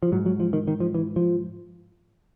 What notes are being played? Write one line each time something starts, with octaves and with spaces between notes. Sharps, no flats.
F3
G#2 F#3
F#3
F3
D#3
D#3
F3
E3
F3